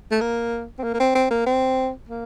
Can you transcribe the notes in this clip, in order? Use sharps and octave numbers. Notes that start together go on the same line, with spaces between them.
A3
A#3
C4
A#3
A#3
C4
C4
A#3
C4
A#3